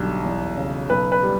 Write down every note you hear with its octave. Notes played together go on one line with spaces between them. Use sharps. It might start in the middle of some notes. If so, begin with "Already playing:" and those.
Already playing: B1 D3 G3
E2
C#3
B1 B4
B4
G3